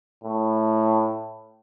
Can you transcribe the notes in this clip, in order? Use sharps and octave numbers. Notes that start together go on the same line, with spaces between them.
A2